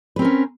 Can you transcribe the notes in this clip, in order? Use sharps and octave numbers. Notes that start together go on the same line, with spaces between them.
C4 C#4 A#4 B4